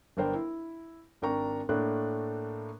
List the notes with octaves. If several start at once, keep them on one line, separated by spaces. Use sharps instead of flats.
G1 D4 A#4 C5 G5
E4
G#1 D4 A#4 G5 A#5 C#6
A2 A3 A#3 D4 A#4 F#6